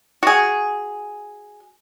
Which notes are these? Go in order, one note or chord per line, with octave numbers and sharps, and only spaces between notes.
F#4 G#4